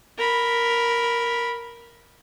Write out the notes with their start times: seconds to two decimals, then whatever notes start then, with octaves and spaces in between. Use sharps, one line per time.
0.18 A#4 B5